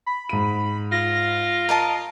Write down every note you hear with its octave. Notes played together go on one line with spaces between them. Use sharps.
B5
G#2 D#7
F4 A#6
A#4 D#5 A5